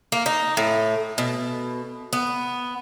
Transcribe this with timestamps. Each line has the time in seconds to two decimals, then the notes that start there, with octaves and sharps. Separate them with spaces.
0.12 A#3
0.26 D#4
0.57 A2
1.18 B2
2.13 B3